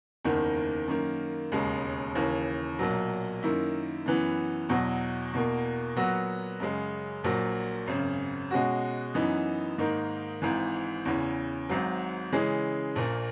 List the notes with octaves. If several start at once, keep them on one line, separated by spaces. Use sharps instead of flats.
F#1 E2 D#3 A#3
F#2 D#3 A#3
E1 D#2 C#3 G#3
D#2 C#3 E3
B1 A#2 F#3
F#2 D#3 A#3 E4
F#2 E3 B3
E2 B2 F#3
E2 B2 A#3
A#2 F#3 B3 F#4
F#2 C#3 G#3
A#1 A#2 F#3
G#1 F#2 C#3
B2 G#3 C#4 F#4
F#2 E3 B3 D#4
G#2 D#3 A#3 D#4
G#1 G#2 E3
E2 C#3 E3
G#1 G#2 F#3
C#3 E3 G#3 C#4 G#4
A#1 A#2 A#3